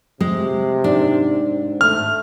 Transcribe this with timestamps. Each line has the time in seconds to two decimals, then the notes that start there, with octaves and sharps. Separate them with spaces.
0.20 C3 G#3
0.84 G#2 D4
1.81 A3 F6